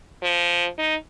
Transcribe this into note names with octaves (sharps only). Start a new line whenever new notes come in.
F3
D#4